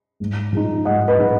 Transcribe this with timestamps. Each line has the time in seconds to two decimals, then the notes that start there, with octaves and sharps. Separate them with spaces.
0.20 G#2
0.53 F3 G#3 D#4
0.85 G#2 D#5 F#5
1.08 B4 D#5
1.19 F3 G#3 D#4